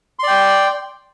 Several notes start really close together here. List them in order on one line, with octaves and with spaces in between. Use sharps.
C6 D5 G5